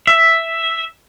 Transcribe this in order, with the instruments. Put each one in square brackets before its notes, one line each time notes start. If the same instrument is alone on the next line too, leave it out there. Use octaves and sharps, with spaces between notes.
[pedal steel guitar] E5